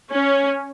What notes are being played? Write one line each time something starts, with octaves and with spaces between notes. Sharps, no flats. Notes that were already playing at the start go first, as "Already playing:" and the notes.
C#4